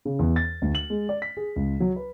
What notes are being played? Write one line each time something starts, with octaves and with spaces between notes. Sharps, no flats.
C#3
E2
A6
D2
F#7
G#3
D5
B6
G#4
C#2
F#3
B4